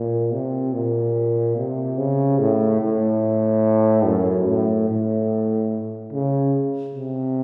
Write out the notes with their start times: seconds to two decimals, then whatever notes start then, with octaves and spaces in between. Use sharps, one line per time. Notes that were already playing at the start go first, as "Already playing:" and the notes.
Already playing: A#2
0.32 C3
0.73 A#2
1.56 C3
1.97 C#3
2.39 A2
2.81 A2
4.05 F#2
4.46 A2
4.89 A2
6.12 C#3
6.95 C3